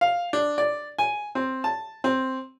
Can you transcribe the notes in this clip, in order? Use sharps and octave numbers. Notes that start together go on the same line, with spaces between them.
F5
D4
D5
G#5
C4
A5
C4